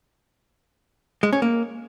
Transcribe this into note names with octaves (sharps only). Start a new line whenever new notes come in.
G#3
C#4
A#3